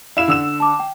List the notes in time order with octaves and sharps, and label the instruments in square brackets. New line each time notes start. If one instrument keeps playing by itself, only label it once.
[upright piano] E4 F5 E7
D3 E6 E7
[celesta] A5 D6
G5